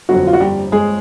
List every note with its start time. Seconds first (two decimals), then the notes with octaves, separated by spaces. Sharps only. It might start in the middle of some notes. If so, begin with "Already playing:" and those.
0.09 G1 F2 D3 F#3 F#4
0.27 F4
0.33 F#4
0.40 G3 G4
0.72 G#3 G#4